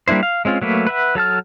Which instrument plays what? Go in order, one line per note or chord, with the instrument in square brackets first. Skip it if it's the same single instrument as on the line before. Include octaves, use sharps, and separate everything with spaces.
[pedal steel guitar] G3 A#3 D4 E4 C5
F5
G#3 C4 C#4 F4
F#3 A3 A#3 B4
B4 E5 F#5
F#3 A4 A5 F6